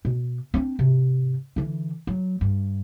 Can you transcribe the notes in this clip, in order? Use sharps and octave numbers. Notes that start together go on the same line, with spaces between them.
B2
C4 D4
G#2 C3
D3 E3
F#3
G2